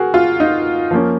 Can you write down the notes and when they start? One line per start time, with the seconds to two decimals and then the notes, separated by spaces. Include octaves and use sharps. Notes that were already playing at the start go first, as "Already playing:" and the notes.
Already playing: F#4 G#4 A#4
0.14 F4
0.40 D#4
0.91 F3 A#3 C#4